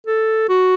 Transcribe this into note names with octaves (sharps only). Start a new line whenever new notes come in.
A4
F#4